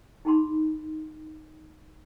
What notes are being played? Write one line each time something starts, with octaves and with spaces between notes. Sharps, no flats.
D#4 G#4 A5 B5 C6